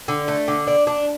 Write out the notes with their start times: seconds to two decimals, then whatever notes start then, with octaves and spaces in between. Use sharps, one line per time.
0.08 D3
0.28 A3
0.48 D3
0.67 D4
0.87 D4